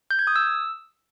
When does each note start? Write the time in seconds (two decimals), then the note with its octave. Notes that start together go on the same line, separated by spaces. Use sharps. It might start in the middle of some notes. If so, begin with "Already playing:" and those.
0.11 G6
0.19 G#6
0.27 D#6
0.36 E6